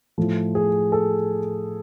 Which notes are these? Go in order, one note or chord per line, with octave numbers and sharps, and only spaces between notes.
A2 F3 A3
G#4
A4